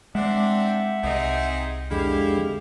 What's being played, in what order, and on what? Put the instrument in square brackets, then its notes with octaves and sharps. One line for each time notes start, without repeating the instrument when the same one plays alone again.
[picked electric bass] G#3 [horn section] C4 D4 [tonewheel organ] E5 F#5
[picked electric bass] C2 [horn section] C4 D#4 G#4
[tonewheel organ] F2 D3 G#3 [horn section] E4 G4 F5